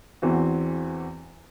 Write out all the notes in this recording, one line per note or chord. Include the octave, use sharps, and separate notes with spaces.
E2 E3 C4 F#4